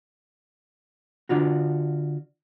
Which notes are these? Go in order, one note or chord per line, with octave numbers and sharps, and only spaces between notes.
D3 D4 F4 F#4